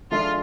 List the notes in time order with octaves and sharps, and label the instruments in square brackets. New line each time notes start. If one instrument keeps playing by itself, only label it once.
[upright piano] F3 G#3 D4 A4 E5 [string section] F4